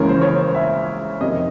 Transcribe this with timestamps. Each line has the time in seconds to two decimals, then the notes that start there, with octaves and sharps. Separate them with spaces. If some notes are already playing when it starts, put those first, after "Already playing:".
Already playing: C#2 C#3 E3 G#3 C#4 A#4
0.09 C5
0.21 C#5
0.55 E5
1.21 F2 C3 D#3 D#5